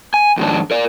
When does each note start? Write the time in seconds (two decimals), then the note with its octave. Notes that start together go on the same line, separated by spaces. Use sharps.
0.14 G#5
0.37 F2 G#2 D#3 D4
0.71 A#4 D5